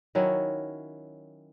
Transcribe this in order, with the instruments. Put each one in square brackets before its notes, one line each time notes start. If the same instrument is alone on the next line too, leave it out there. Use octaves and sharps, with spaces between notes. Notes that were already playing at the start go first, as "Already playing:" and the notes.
[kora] D#3 F#3 C#4 E4